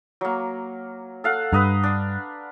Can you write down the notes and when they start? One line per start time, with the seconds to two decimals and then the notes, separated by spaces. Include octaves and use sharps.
0.21 F#3 A#3
1.24 A4 F5 F#5
1.53 G2 B4 D#5 A#5
1.83 D4